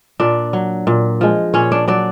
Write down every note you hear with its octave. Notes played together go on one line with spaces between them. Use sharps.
A#2 D4 D5
F#3
A#2
F3 G#3
A#2 C#4 C#5
D4 D5
F#3 D4 D5